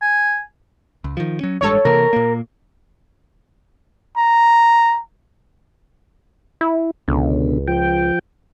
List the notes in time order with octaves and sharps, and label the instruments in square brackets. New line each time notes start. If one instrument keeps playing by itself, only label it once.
[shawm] G#5
[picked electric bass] C#2
D#3 F3
F#3 C#4
[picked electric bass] A1 G2 G#3 [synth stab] A4 C#5
[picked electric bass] C3 E3 A#3 [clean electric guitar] A#4
[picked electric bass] A#2 A#3
[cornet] A#5
[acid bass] E4
[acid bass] C#2 [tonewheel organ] B2 D3
[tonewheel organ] F3 G5